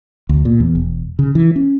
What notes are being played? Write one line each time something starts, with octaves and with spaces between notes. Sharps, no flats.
D2
A#2
E2
E1
C#3
E3
C#4